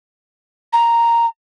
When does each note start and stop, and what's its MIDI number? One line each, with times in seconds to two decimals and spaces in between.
0.73 1.26 82